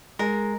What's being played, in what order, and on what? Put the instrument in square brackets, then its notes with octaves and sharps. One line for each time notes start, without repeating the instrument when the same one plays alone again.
[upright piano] G#3 [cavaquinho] A#4